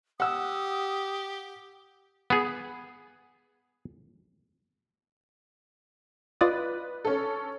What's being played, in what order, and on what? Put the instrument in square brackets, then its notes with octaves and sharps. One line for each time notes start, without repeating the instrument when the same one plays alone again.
[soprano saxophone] G4 [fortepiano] F#5 E6 [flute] D#6
[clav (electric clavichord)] B3 G#4
[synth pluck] F4 D5 D#5 [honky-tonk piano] B4
[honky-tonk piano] C#4 A4